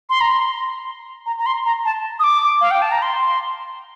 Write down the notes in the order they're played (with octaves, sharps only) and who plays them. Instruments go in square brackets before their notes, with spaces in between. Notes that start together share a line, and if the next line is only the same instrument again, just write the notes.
[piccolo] C6
A#5
C6
A#5
A#5
C6
A#5
A5
D#6
D6
F5
G5
A5
A#5
C6